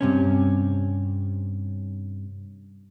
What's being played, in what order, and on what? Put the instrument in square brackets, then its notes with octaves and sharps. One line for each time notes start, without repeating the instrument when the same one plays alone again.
[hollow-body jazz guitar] G2 C3 C#4